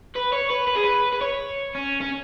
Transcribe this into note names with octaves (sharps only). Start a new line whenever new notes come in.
B4
C#5
B4
B4
G#4
B4
B4
C#5
C#4
C#4